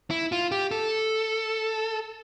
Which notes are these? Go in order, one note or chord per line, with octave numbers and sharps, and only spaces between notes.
E4
F4
G4
A4